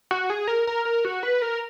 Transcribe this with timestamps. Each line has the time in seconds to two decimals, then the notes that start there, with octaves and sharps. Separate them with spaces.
0.11 F#4
0.30 G#4
0.48 A#4
0.67 A#4
0.85 A#4
1.05 F#4
1.23 B4
1.42 A#4